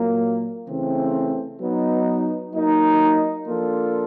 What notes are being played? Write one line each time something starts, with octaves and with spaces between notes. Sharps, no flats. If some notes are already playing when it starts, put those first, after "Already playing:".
Already playing: A#2 F#3 A#3
C#3 E3 A3 C4
F#3 B3 D#4
F#3 A#3 D#4
F3 A#3 D4 F4 A4